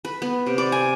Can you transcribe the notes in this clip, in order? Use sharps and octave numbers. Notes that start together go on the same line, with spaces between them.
B4
B3
C3
D5
G#5